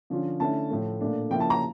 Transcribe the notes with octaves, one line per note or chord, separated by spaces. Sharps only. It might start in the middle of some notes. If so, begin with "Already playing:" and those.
D3 F3 C#4 F4
D3 A3 C#4 E4 A5
A2 F3 A3
A#2 A3 D4
C#3 F3 A#3 E4 G5
A5
A#5